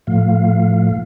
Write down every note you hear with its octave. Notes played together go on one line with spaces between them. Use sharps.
A2 F3 A3 F5